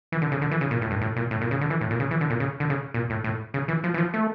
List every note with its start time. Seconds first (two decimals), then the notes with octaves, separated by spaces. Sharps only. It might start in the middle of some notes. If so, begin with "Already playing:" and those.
0.12 E3
0.22 D3
0.32 C#3
0.41 D3
0.51 E3
0.61 C#3
0.71 A#2
0.81 A2
0.91 G2
1.01 A2
1.16 A#2
1.31 A2
1.41 A#2
1.51 C#3
1.61 D3
1.70 E3
1.81 A2
1.91 A#2
2.00 C#3
2.11 E3
2.21 D3
2.30 A#2
2.40 C#3
2.60 D3
2.70 C#3
2.94 A#2
3.10 A2
3.24 A2
3.54 C#3
3.68 E3
3.84 F3
3.94 E3
3.98 F3
4.14 A3